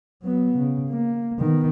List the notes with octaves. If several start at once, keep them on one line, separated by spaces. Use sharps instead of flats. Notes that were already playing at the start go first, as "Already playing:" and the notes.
F#3 B3
C#3
A#3
D#3 B3